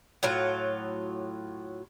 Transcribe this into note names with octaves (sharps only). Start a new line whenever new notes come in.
A2 F#3 F4